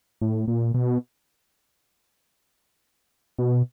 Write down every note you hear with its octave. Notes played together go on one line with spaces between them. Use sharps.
A2
A#2
B2
B2